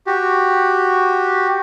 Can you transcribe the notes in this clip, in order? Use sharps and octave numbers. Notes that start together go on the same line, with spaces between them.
F#4 G4